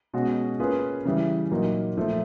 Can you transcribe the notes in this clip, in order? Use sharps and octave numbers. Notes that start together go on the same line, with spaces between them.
B2 G#3 C#4 F#4
A#3 C#4 F4 G#4 B4
C#3 E3 G3
A#2 F#3 A#3 D#4
A#2 F3 A3